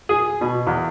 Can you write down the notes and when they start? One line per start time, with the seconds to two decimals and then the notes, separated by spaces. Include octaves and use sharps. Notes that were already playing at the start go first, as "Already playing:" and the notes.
0.09 G#4
0.41 B2
0.67 E2